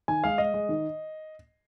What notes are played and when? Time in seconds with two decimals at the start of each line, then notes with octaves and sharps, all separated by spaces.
0.08 D#3 G#5
0.24 G#3 F5
0.38 G#3 D#5
0.54 G#3
0.69 D#3